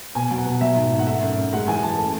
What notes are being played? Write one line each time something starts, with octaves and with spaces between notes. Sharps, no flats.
B2 G#5
F#3
F#5
B2
F#3 E5
G#2
G#2
F#5
A3 E5
F#2
F#2
G#3 F#5
E3 G#5
F#2 A5
A3